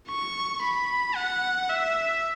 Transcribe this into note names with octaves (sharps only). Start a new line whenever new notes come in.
C#6
B5
F#5
E5